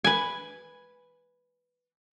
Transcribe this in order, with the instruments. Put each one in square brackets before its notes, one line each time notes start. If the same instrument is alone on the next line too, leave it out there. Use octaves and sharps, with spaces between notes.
[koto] B4 G#5